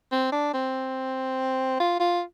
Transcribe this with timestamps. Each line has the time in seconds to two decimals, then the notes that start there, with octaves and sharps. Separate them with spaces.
0.12 C4
0.32 D4
0.54 C4
1.80 F4
2.00 F4